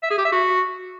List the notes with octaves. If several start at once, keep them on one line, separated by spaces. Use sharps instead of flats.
E5
G#4
G4
E5
F#4